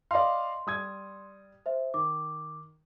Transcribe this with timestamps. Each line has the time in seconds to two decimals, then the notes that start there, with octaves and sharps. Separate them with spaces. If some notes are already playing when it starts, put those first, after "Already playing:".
0.11 D5 D#5 F5 C6
0.67 G3 D#6 G#6
1.66 C5 E5
1.94 D#3 D6